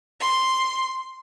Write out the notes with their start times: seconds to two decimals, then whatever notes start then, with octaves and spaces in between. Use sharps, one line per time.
0.19 C6